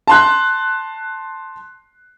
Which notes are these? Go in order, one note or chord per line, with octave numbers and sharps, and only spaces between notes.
A5 C6 F#6